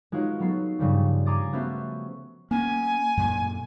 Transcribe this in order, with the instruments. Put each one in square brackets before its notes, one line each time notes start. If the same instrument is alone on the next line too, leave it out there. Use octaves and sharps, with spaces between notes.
[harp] G#3 D#4 F4 F#4 B4 C#5
F#3 B3 A4 C7
G2 C#3 F3 G3
G#5 A#5 C6 D6 D#6 A6
A3 B3 C#4 F#4 C5 E5
[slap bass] A#3 C#4 [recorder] G#5
[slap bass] F#2 A#2